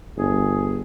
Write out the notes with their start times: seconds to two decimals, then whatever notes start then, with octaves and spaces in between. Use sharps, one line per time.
0.17 G1 G#4